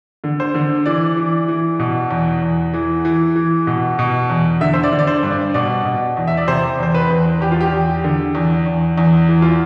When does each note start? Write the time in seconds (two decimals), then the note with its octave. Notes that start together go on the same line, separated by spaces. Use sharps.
0.24 D3
0.40 C5
0.54 D3
0.86 E3 D5
1.17 E3
1.48 E3
1.79 B2
2.11 E2
2.42 E2
2.74 E3
3.05 E3
3.36 E3
3.67 B2
3.99 B2
4.29 E2
4.61 D3 E5
4.74 C5
4.84 D5
4.92 D3
4.99 D5
5.07 C5
5.23 G2
5.31 D5
5.54 B2 D5
5.85 B2
6.17 E2
6.27 E5
6.37 D5
6.48 C3 C5
6.79 E2 C5
6.94 B4
7.10 E2
7.41 E2 G4
7.52 F4
7.61 G4
7.72 E2
8.04 D3
8.35 E2
8.66 E2
8.98 E2
9.29 E3
9.42 F4